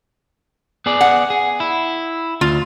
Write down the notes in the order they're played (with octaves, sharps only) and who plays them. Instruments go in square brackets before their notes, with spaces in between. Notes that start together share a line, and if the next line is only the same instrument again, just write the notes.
[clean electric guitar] B3 G#4 D5
[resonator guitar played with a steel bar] F#5
[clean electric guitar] G#4
E4
[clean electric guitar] D2 [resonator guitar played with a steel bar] F4